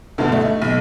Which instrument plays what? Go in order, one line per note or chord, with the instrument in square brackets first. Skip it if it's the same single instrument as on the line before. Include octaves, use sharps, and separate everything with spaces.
[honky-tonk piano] D2 G2 B2 D3
A3 D#4
B1